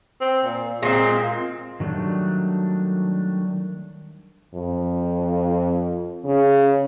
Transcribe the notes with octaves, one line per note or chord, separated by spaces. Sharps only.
C4
A#2
A#2 G#3 C4
D#3 F#3 G3 A3 D4
F2
C#3